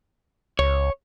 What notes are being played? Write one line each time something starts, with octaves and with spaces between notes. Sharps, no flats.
C#2 C#5